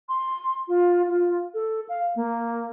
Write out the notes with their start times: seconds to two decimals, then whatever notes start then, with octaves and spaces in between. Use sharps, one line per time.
0.09 C6
0.68 F4
1.08 F4
1.54 A4
1.89 F5
2.16 A#3